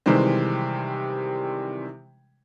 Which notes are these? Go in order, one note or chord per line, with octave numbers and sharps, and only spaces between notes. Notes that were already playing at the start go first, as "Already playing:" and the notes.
C3 D#3 E3 G3 G#3 C4